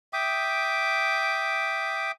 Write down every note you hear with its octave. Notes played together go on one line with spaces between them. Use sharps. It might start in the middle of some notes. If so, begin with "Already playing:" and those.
E5 G5 D6 D#6